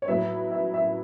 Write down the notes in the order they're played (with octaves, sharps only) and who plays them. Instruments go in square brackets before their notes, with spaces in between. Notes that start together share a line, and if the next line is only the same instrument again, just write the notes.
[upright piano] C#5
[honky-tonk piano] A2 F#3 B3 E4 [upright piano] E5
[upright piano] E5
E5